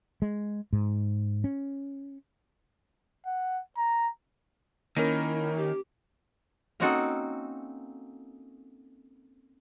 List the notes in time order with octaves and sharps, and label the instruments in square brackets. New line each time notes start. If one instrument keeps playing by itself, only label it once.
[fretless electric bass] G#3
G#2
C#4
[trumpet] F#5
A#5
[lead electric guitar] D#3 [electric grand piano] A#3 C#4 A#4 [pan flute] E4
[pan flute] G4
[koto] A#3 C4 C#4 D#4 F#4 A4